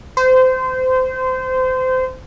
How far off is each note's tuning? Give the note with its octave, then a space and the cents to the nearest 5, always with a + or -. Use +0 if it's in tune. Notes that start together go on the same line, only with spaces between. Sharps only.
C5 -25